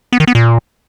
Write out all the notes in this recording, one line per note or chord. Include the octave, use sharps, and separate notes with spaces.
B3
D#3
B3
A#2